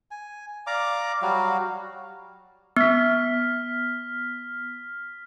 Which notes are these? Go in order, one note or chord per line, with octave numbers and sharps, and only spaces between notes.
G#5
D5 F5 A#5 D6
F#3 G3 F#4 F5
B3 F6 B6